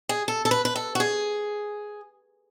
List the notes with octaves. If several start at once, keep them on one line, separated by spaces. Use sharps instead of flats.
G#4
A4
A4
B4
B4
A4
F#4
G#4